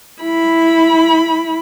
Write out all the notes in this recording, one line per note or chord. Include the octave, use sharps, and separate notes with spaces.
E4 B5